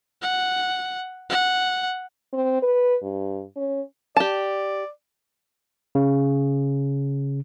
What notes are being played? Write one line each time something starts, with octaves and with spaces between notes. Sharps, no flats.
F#5
F#5
C4
B4
G2
C#4
G4 D5 A5
C#3